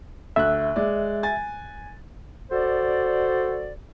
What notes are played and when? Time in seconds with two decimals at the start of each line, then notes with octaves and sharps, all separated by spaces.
0.36 D2 E5 F#6
0.76 G#3 D5
1.23 G#5 A6
2.51 F#4 A4 C5 D5